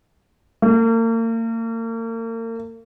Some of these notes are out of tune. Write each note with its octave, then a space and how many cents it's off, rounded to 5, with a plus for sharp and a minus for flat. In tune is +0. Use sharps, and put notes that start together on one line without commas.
A#3 -40